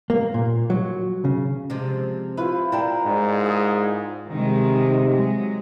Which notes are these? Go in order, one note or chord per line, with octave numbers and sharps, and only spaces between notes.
A#3
A#2
F#3
C#3
C3 F3 G#3
E4 F4 B4 C5
D4 E4 A#4 G5 A#5
G#2
G#4 D5
C3 D#3 G#3
F#3 G#3